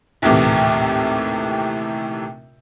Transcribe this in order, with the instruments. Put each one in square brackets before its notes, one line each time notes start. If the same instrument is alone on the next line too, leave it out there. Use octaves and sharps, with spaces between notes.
[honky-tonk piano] A#1 D#2 A2 C3 E3